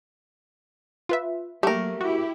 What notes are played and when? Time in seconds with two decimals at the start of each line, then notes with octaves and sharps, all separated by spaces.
1.09 F4 B4 E5
1.63 F#3 A3 A#3 G4 A#4
2.01 E4 F#4 G4